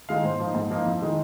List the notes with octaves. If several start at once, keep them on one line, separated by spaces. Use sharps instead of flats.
D#3 G#3 D#4 F5
G#2 C5
F3 A#3 D#4
G#2
F3 A#3 D#4
F2
D#3 G#3 D#4